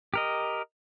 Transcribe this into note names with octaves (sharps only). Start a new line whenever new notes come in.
G4 A#4 D#5